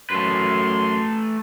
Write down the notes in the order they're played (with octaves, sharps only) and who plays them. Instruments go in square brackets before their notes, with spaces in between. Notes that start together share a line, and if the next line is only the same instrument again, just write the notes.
[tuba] F#2 [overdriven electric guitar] A3 B4 [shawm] C6